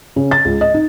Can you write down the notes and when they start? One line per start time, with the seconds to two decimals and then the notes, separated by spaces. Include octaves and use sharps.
0.16 C#3
0.31 A6
0.45 C#2
0.61 D#5
0.74 D#4